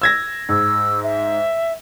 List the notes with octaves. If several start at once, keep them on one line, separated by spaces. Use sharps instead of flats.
E6 G#6 A#6
G#2 E6
E5